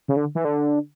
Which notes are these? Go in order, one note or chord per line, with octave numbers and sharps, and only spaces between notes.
C#3
D3
E3
D3